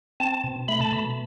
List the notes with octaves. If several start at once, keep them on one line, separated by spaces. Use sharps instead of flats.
C4 A5
B2
A3 B5
A5
B2 B5